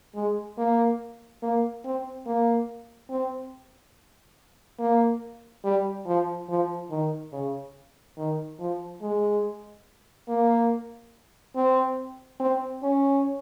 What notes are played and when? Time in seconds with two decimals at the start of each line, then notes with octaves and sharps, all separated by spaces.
0.15 G#3
0.58 A#3
1.43 A#3
1.85 C4
2.26 A#3
3.10 C4
4.80 A#3
5.64 G3
6.07 F3
6.49 F3
6.91 D#3
7.33 C#3
8.18 D#3
8.60 F3
9.02 G#3
10.29 A#3
11.56 C4
12.40 C4
12.83 C#4